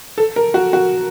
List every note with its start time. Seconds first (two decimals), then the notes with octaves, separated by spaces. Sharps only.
0.18 A4
0.36 A#4
0.54 F#4
0.73 F#4